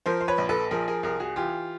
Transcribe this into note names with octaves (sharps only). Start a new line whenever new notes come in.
F3 A#4 C5
C5
B4 C#5
A#1
A4 B4
F3 G#4 A#4
G#4 A#4
C2 G#4 A#4
F#4 G#4
E3 F4 G4